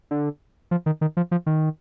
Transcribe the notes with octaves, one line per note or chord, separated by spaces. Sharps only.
D3
F3
D#3
D#3
F3
F3
D#3